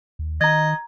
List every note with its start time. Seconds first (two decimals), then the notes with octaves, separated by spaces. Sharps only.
0.19 D#2
0.41 D#3 D#5 A#5 G#6